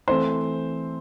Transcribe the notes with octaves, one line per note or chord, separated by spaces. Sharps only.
E3 A3 C4 C5